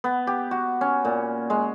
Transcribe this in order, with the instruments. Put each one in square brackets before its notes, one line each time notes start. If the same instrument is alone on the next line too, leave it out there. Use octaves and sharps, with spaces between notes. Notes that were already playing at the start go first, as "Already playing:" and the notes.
[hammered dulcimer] B3
G4
F#4
C#4
A#2
G#3